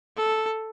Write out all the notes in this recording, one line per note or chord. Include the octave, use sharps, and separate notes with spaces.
A4